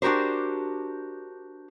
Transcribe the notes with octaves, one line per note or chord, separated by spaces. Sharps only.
D4 F#4 G4 A#4 C5